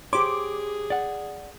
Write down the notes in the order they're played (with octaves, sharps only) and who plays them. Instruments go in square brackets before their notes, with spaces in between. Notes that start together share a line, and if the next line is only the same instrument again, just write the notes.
[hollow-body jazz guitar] G4 C5 C#5 [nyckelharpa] G#4 [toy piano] C6 [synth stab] D6
[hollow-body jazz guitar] D5 F#5